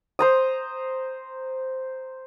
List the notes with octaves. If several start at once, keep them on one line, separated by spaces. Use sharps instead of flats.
C5 A#5 D#6